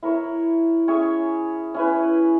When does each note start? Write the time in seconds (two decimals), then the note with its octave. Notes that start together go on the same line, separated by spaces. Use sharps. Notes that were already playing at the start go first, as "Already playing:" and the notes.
0.03 E4 A#4 C#5 E5
0.88 C#4 G#4 C#5 E5
1.74 C#4 E4 B4